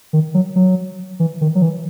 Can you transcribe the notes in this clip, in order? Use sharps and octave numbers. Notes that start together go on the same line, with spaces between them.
D#3
F#3
F#3
E3
D#3
F#3
E3